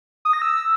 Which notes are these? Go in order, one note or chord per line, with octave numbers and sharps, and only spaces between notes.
D#6
A#6
E6